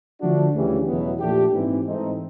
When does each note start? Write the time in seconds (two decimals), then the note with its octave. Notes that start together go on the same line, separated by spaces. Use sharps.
0.21 D3 F3 A3 D4 F#4
0.53 D2 C#3 E3 G3
0.87 E2 B2 F#3 B3 E4
1.20 A#2 F3 A3 D4 G4
1.52 G#2 E3 G#3 C4
1.85 G#2 E3 A3 C4 D#4